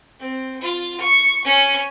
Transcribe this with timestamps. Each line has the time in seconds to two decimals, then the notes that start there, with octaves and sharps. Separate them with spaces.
0.20 C4
0.62 F4
1.01 C#6
1.45 C#4